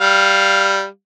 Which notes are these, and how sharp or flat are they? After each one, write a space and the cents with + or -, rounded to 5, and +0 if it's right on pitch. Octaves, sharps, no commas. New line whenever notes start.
G3 +0 F5 +0